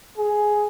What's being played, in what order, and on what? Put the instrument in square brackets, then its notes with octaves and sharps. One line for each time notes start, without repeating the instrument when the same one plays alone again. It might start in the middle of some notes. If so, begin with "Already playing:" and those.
[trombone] G#4